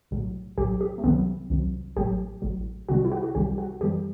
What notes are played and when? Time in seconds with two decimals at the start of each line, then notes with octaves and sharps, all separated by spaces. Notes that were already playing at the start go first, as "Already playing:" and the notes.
0.11 B1 A2 F#3
0.58 B1 A2 F#3 G4
0.81 G4
0.98 A3
1.04 C2 C3 D#3 F#3 B3
1.50 C2 C3 D#3 F#3
1.96 A1 A2 F#3 G4
2.42 A1 A2 F#3
2.89 C2 C3 D#3 G3 F#4
3.05 E4
3.12 F#4
3.23 F#4
3.35 C2 C3 D#3 G3 G4
3.58 F#4
3.81 F#2 E3 G3 G4